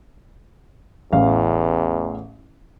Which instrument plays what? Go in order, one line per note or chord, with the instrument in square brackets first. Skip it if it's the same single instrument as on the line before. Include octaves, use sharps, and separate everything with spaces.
[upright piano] A1 F5 [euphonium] E2